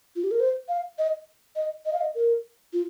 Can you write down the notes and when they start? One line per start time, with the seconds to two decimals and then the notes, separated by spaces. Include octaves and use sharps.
0.16 F4
0.24 G4
0.31 A#4
0.40 C5
0.69 F5
0.98 D#5
1.56 D#5
1.86 D#5
1.93 F5
2.01 D#5
2.15 A#4
2.73 F4